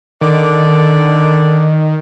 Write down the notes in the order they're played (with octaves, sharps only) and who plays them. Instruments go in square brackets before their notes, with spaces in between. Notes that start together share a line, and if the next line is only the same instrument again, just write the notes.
[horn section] D3 D5 [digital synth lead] D#3